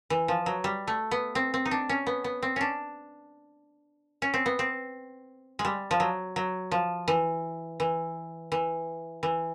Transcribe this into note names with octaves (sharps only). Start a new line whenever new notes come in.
E3
F3
F#3
G3
A3
B3
C4
C4
D#4
D4
C#4
B3
B3
C4
C#4 D4
C#4
C4
B3
C4
G#3
G3
F3
F#3
F#3
F3
E3
E3
E3
E3